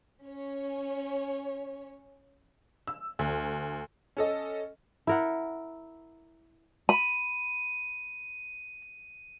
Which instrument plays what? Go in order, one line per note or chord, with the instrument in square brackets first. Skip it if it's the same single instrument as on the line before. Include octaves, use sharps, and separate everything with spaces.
[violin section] C#4 C#5
[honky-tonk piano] E6
D2
C#4 A4 D#5
[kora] E4 A#4 F#5
[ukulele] B5 [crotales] D#7